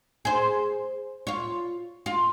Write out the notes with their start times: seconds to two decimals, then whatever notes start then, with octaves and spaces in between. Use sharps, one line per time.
0.25 G#4 C5
1.27 F4 C#5
2.06 F4